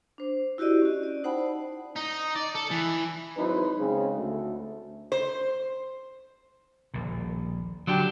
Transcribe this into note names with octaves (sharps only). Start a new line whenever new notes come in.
D4 C5
E4 F#4 G4 D5 D#5
C#4 F#4
D5
D#4 C5 F#5 G5 A5 B5
D#5
D#4
D5
A4
E3
G#1 F#3 D#4 E4 B4 C5
C#3 G#3 C4 C#4 D#4 G#4
D2 A3
C5
D#1 A#1 A#2
D3 F#3 D4 G4